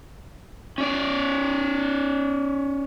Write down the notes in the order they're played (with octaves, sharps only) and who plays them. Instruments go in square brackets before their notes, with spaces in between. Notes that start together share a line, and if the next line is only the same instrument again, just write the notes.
[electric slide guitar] C#4 D5